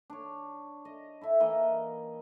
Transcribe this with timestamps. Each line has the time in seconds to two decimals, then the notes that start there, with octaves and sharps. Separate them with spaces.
0.10 D4 C#5
0.85 D#5
1.21 E4 A4 E5
1.40 E3 A#3 D#5